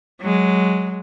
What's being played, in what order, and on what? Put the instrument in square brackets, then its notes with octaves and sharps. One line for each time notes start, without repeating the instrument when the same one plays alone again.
[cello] F#3 G#3